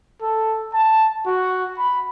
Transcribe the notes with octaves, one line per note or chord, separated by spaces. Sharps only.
A4
A5
F#4
B5